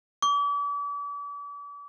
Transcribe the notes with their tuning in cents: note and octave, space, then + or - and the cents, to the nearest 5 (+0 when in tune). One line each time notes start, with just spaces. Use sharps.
D6 -40